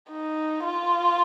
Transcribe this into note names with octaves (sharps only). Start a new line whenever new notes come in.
D#4
F4